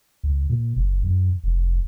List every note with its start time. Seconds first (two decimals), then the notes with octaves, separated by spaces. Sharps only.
0.24 C#2
0.50 A#2
0.76 F#1
1.03 F#2
1.44 F1